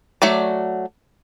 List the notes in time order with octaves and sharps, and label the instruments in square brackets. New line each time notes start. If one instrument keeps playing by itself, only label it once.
[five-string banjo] F#3 A3 F#4 D5